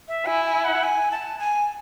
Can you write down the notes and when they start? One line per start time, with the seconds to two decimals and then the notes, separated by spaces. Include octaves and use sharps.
0.08 E5
0.26 E4 G#5
0.45 G#5
0.64 F#5
0.83 G#5
1.11 A5
1.40 G#5